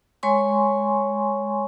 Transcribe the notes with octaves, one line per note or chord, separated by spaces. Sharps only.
G#3 C#5 G#5 C6 C#6